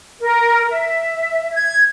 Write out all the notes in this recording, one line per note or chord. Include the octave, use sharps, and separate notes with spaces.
A#4
E5
G#6